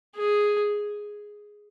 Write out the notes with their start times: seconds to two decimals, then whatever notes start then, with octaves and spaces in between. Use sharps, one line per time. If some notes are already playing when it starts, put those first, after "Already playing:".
0.16 G#4